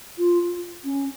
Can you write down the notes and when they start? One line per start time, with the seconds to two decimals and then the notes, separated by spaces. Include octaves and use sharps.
0.18 F4
0.85 C#4